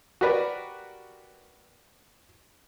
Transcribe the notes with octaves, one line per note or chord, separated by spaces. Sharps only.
F#4 G4 A#4 B4 D5